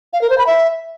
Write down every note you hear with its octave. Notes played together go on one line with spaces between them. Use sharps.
F5
A#4
C5
B5
E5